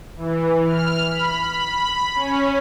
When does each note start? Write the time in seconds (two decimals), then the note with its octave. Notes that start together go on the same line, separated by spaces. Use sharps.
0.16 E3
0.67 F6
1.08 B5
2.15 C#4